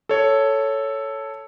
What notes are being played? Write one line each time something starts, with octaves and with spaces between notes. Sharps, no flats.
A4 C#5